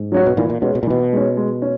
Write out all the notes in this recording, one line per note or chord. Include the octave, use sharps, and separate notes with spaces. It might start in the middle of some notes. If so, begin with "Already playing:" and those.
Already playing: G#2
F#3 C#4 F#4
B2
A#2 E3
A#2
B2 G#3 C#4
B2
A#2
B2 E3
G#3 C#4
G#3
C#4